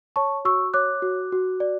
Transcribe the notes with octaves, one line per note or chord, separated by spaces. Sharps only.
C#5 A5 C#6
F#4 C#6 E6
C#5 D6 F#6
F#4
F#4
D5